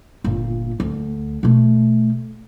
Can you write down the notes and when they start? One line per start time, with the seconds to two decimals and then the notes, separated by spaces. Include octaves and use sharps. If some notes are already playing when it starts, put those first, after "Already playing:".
0.24 G1 A#2
0.80 D2
1.43 B2 A3